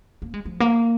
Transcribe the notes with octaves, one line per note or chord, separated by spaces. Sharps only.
A#3
G#3
F3
A#3